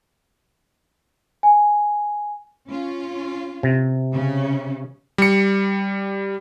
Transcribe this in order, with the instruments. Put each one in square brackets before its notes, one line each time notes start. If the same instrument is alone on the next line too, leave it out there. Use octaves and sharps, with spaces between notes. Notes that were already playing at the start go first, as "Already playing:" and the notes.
[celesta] G#5
[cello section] C#4 F4
[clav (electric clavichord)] C3
[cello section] C#3 C#4
[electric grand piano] G3 C#7